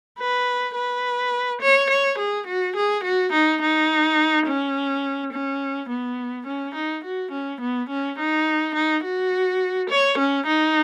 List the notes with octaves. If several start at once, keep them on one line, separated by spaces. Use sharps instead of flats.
B4
B4
C#5
C#5
G#4
F#4
G#4
F#4
D#4
D#4
C#4
C#4
B3
C#4
D#4
F#4
C#4
B3
C#4
D#4
D#4
F#4
C#5
C#4
D#4